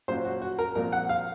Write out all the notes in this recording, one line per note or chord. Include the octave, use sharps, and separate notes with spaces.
A#2 F#3 C#4 F4 C5
F#4
F#4
A#4
A#2 F3 C4 A#4
F#5
F5